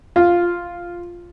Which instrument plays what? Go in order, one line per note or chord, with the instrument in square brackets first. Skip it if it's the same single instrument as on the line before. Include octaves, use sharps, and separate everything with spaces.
[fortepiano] F4